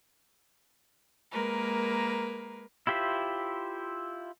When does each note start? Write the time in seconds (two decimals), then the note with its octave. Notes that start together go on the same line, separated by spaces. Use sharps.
1.31 G#3 A#3 A#4 B4
2.87 E4 F4 G4 C5 E5